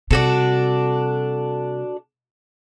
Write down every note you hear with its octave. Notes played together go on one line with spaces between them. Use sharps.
C3 G3 D4 F#4 A4